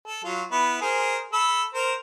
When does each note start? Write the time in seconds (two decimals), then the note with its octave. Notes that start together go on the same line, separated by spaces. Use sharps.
0.08 A4
0.24 F#3 F4
0.51 B3 E4
0.81 G#4 A#4 C5
1.33 A4 B5 E6
1.75 A#4 C5 A#5